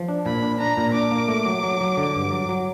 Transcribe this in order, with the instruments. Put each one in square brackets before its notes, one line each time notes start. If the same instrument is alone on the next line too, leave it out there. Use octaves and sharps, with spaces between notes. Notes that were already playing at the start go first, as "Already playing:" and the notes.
Already playing: [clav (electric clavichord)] F3
D4
[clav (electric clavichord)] A#2 [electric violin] B5
[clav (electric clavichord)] D4
[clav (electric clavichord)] D4 [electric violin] A#5
[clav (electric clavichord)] A#2
[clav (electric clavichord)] D4 [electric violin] D6
[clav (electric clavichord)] A#3
A3
F#3
F#3
F#3
D3
G2
F#3
F#3